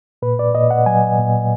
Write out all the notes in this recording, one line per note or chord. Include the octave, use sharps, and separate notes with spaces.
A#2 B4
D5
A#2 D#5
F#5
F#3 G#5
A#2